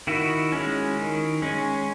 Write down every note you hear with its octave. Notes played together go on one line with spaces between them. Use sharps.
D#3 E4 F#4
G#3 C#4
D#3
G#3 C#4